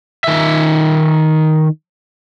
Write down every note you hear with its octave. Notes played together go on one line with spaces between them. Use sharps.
D#3 E5